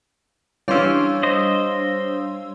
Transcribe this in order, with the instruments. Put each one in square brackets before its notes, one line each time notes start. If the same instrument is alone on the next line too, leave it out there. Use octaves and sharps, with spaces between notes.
[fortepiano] E3 C#4 [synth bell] G3 D4 F5 [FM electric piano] C#5 C6 E6
[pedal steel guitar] C5 D#5